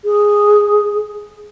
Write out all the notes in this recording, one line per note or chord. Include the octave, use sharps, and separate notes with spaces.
G#4